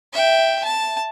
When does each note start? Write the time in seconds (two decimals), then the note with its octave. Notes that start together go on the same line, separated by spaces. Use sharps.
0.13 E5 G5
0.65 A5